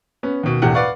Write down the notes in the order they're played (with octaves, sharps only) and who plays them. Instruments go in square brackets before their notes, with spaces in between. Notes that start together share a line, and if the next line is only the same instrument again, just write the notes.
[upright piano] B3 C#4
D#2 B2
E1 E2 A2 G4 F#5
B4 D5 F5 F#5 C#6